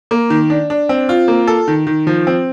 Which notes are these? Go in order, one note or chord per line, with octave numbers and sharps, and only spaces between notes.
A#3
D#3
D4
D4
C4
F4
A#3
A4
D#3
D#3
F3
C4